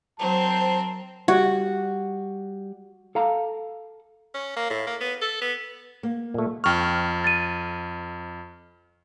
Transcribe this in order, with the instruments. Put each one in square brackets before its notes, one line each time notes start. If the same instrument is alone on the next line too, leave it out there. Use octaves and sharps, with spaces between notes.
[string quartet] F#3 C5 [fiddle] C4 A#4 [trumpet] A5
[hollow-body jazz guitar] G3 D5 [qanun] F#4
[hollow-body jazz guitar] A4 F5 A#5
[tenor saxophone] C#4
A#3
A2
A#3
B3
A4
B3
[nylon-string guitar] A#3
[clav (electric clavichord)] A#2 A3
[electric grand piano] F2 F6 [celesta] G5 C#6
[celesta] A6 D#7